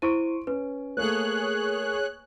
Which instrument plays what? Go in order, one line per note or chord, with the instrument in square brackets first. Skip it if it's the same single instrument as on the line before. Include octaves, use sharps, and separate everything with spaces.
[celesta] E4 C5 D#7 [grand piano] C6 C#6 D7
[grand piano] C#4 [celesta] B4
[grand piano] A3 A#3 [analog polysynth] G#4 C#5 F#6